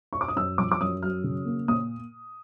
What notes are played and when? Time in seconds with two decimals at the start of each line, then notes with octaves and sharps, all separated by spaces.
0.13 C#6
0.21 D6
0.28 D#6
0.36 F#2 E6
0.58 F3 D6
0.72 D6
0.81 F#2 D#6
1.03 F#3 F6
1.24 C#3
1.45 A#3
1.68 A#2 D#6